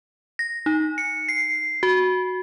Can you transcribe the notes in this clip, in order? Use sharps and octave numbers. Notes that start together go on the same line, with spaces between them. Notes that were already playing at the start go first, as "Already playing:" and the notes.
A#6
D#4
C#7
C7
F#4